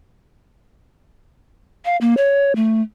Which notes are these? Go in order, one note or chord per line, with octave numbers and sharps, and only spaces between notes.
F5
A#3
C#5
A3